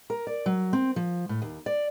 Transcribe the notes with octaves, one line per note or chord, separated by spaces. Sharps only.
A#4
D5
F#3
C4
F3
A2
D#2
D5